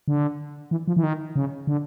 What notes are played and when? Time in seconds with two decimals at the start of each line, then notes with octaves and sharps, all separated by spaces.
0.08 D3
0.71 E3
0.88 F3
0.97 E3
1.03 D#3
1.36 C#3
1.67 D3